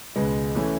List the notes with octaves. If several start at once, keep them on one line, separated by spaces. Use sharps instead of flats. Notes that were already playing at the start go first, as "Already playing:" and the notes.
C#2 B2 G#3 B3
E3 A3 C#4 E4